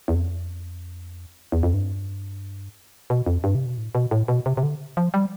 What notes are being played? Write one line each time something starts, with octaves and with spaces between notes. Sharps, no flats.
E2
F2
E2
F2
G2
B2
F2
G2
C3
B2
A2
B2
A2
B2
C3
C3
D3
F3
G3